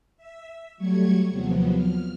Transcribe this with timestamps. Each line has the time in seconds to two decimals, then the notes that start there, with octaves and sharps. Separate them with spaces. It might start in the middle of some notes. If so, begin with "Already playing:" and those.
0.17 E5
0.77 F#3 G3 A3 C#6 G#6
1.31 D#2 C3 F3 F#3 B3
1.75 F6